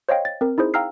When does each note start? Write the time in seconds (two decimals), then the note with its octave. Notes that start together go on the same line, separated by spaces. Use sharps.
0.09 C5 C#5 D#5 F5 G5
0.25 A6
0.41 C4 A#4
0.58 D#4 E4 G#4 C5
0.74 F5 G5 A#5 E6 F6 C7